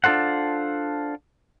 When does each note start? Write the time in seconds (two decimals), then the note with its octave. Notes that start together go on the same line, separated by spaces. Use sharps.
0.04 D4 F4 A4 C5 F#5